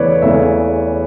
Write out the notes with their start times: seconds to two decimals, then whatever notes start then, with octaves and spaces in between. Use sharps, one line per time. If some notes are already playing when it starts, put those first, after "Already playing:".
Already playing: E2 C#3 E3 A3 B4 C#5 D5
0.22 E2 C#3 E3 A3 E5